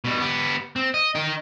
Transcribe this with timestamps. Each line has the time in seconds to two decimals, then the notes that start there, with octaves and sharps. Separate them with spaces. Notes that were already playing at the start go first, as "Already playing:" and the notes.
0.05 B2 G3
0.20 B3 G4
0.76 C4
0.94 D#5
1.15 D#4 G5